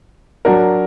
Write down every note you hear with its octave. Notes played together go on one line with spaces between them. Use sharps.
F#3 D4 F#4 A#4